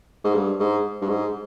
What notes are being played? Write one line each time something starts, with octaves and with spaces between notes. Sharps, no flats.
G#2
G2
G#2
G2
G#2